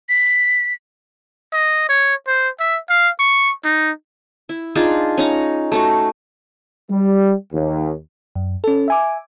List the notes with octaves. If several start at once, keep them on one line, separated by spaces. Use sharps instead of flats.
B6
D#5
C#5
C5
E5
F5
C#6
D#4
E4
D4 D#4 F4 G#4
C#4 D#4 A#5
A3 D#4 F#4
G3
D#2
F#2
C#4 A4
E5 G#5 D6